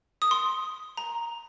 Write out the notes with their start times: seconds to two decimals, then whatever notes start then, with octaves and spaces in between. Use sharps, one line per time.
0.22 D#6
0.31 C6
0.97 A#5